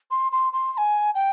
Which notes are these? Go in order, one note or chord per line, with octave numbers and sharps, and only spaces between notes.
C6
C6
C6
C6
G#5
G5